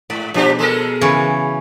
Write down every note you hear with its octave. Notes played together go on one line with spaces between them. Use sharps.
G#2 D5
B2 F3 D4 G4
G#3 A4 A#4
C#3 E3 B5 C#6 G#6